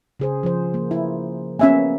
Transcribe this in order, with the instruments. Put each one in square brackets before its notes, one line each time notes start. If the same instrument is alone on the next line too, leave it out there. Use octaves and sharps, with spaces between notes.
[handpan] C#3 G#4 C5
F3 C5
A#3
[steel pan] E4
[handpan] A#3 B3 [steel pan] C#4 E5 G#5